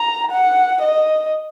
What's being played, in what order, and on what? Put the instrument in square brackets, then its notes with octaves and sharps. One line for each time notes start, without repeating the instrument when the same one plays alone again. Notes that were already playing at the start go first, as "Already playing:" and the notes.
Already playing: [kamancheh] A#5
F#5
D#5